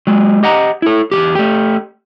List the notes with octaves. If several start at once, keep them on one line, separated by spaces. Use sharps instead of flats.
F#3 G#3
G4 D#5 F#5 A#5
E4 A4
E2 E3 G4
A3 G4